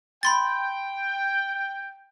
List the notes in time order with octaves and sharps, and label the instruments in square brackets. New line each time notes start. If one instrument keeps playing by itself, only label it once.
[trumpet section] G5 [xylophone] B5 C6 A6